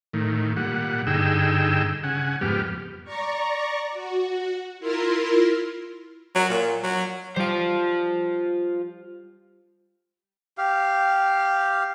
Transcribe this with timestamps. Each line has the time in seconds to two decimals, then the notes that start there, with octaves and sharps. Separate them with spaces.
0.13 A2 D#3
0.57 A#2 G3 F#5
1.07 G2 D3 D#4 G#4 G5 E6
2.03 C#3 F#5 G#5
2.41 F2 G#2 G3 B3 G4 F6
3.04 D5 A#5 C#6
3.92 F#4
4.80 E4 F4 A#4 C6
6.36 F#3
6.50 A#2
6.83 F#3
7.36 G3 F4 C5 D7
10.58 G4 F5